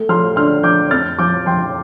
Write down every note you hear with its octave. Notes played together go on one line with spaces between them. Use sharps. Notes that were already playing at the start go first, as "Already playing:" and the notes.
Already playing: A3
F3 C6 F6
D3 C6 F6
F3 D6 G6
F2 F6 A6
F3 D6 G6
F3 G5 C6